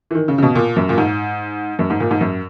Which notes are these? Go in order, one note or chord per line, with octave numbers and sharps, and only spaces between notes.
E3
D#3
C#3
C#3
B2
A#2
F#2
A#2
G#2
F#2
G#2
A#2
G#2
F#2